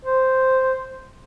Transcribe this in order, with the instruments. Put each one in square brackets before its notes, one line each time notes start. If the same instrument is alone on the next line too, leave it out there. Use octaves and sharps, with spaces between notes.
[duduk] C5